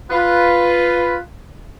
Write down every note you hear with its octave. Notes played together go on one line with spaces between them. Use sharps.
F4 B4